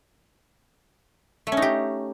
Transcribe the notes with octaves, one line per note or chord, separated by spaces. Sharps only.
A3
C#4
D#4
G4